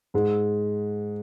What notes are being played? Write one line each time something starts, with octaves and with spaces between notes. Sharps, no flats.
G#2 G#3